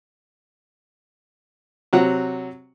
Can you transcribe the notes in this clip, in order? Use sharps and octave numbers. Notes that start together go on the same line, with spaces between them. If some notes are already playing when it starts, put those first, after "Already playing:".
C3 F#3 F#5